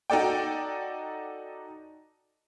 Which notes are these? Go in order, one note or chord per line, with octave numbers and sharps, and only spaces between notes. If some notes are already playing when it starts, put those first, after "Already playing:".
D#4 F#4 A4 D5 G5